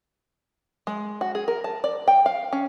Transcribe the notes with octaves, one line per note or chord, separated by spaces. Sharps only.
G#3
F#4
G#4
A#4
A5
D5
G5
F5
C#4